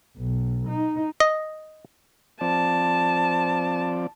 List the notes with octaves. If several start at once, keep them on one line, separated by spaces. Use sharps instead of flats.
B1
D#4
D#5
F3 C4 D5 A5